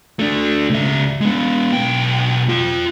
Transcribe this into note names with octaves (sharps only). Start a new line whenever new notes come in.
A3 D4
C#2 E5
G#3 B3
B1 G5
F4 G5